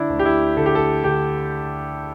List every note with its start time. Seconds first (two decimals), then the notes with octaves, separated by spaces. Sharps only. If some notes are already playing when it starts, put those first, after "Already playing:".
Already playing: D3 D4 E4
0.10 D2
0.19 G4
0.25 E4
0.57 D3 A4
0.66 G4
0.75 A4
1.04 D3 G4